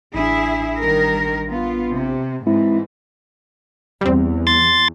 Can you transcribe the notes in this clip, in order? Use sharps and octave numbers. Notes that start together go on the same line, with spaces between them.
A1 D4 E4 G#4 E5
D#3 G3 A#4
B3 F4
C3
G#2 E3 G#3 C4 E4
E2 G3 C4
C6 A6